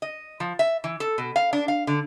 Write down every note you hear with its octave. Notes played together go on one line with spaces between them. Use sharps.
D#5
F3
E5
E3
A4
B2
F5
D4
F5
D3